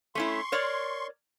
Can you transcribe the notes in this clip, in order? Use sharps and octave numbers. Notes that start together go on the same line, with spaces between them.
A3 C#4 E4 C6 C#6
A#4 C#5 D5